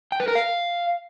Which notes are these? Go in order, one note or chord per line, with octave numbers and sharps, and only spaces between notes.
G5
B4
A#4
F5